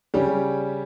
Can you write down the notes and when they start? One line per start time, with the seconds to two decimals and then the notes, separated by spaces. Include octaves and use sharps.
0.14 C#3 G3 C#4 G4